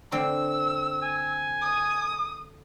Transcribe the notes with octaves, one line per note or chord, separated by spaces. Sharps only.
D3 C4 E6
G#5
D#6